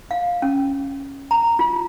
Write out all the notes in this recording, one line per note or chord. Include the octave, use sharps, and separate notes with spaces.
F5
C#4
A#5
F4